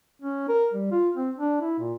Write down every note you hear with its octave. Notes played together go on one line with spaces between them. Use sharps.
C#4
A#4
G3
F4
C4
D4
E4
A#2